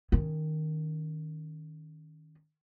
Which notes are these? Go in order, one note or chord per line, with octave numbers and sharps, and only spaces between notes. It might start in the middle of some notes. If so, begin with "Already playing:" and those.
D#3 C#4